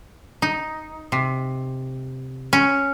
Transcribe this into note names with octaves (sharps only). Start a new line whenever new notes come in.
D#4
C3
C#4